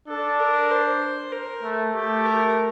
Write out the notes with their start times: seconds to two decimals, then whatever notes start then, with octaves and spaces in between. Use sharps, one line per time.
0.08 D4 A4
0.39 A#4
0.70 C5
1.32 A#4
1.63 A3
1.94 A3 G4
2.25 A#4